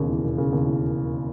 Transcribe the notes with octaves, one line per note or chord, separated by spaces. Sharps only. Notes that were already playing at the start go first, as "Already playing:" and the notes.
Already playing: E1 D#2 C#3
E3
E1
C#3
D#2
E3